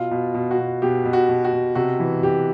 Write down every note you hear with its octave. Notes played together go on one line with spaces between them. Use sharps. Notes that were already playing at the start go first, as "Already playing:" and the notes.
Already playing: B2 F4
B2
B2
F#4
B2
B2 G4
B2
F#4
B2
F#4
B2
C3 F#4
E3
C3 G4